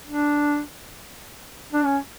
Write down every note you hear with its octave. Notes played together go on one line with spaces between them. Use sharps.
D4
D4
C#4